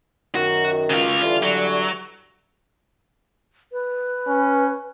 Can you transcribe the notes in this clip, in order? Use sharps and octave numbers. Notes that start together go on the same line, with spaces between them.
F#2 D#3 F#4
C#3 F4
D3 E3 G3 F4
F#3
B4
C#4